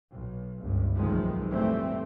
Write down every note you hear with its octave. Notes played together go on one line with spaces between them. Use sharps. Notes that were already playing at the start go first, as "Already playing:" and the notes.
B1
G1 C#2 G2
F1 B1 C3 D#3 F3 G#3
F1 A2 E3 G3 A3 C4